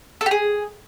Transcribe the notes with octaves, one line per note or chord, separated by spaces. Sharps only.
A4
G4
G#4